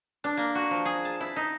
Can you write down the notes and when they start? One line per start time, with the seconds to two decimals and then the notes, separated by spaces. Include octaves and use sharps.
0.24 D4
0.37 A#3
0.55 F#4
0.71 F3
0.85 G#4
1.05 A5
1.20 E4
1.36 D#4